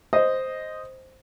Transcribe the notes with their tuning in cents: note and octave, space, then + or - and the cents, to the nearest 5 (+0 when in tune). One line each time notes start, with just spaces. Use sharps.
C5 +0 D#5 +0